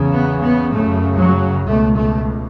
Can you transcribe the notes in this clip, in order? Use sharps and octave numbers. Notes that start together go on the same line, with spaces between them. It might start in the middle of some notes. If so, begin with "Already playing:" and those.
Already playing: E2 C#3
B3
B3
F#2 C#3 A3
F#3
C#2 B2 A3
A3